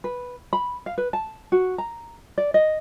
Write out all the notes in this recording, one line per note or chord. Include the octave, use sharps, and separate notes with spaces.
B4
B5
F5
B4
A5
F#4
A#5
D5
D#5